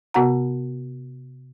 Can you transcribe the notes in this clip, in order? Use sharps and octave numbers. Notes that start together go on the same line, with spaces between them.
C3 B3 F#4 F#5 A#5